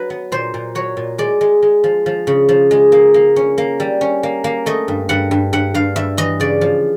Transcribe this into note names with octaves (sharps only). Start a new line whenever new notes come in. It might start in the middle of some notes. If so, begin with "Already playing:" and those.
Already playing: F#3 B4
B3
A#2 C5
A#2
F#3 C#5
A#2
G#3 D5
G#3
G#3
F3
F3
C#3
F3
G#3
A#3
A#3
C#4
A#3
G3
C#4
A#3
A#3
A3 D#5
G2
G2 F#5
G2
G2 F#5
G2 F5
G2 E5
E3 D#5
C#3 D5
F3